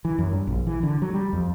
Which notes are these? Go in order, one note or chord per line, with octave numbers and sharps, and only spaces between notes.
E3
F#2
G2
A#1
E3
D3
F#3
G3
F2